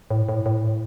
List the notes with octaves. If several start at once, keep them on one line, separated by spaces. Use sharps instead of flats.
A2
A2
A2